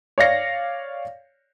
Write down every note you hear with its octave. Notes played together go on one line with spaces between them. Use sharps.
C#5 D5 F5 A#6 C#7